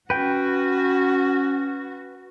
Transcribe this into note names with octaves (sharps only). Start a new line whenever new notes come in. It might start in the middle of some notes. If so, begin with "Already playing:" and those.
C#4 F#4 B4 G5